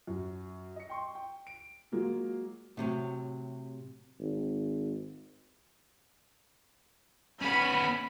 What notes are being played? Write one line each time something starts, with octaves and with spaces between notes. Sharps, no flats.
F#2
D#5 C#7
G5 C6 C#6
G5
D7
F#3 G#3 A#3 F4 G#4
A2 C3 E3 F#3
G#1
B3 C#4 B5